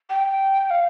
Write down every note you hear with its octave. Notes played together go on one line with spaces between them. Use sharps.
G5
F5